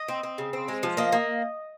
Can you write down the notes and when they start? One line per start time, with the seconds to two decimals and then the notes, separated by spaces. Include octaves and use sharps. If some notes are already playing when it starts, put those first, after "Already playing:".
Already playing: D#5
0.09 C4
0.23 C4
0.38 C#3
0.53 C4
0.68 G#3
0.83 F3
0.97 A#3 D#5
1.12 A#3